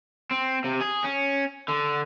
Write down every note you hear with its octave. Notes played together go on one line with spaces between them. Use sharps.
C4
C3
G#4
C#4
D3